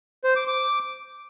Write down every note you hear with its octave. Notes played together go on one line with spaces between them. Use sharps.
C5
D6
D6